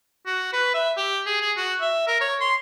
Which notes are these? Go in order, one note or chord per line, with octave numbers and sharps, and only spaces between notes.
F#4
B4
E5
G4
G#4
G#4
F#4
E5
A#4
C#5
C6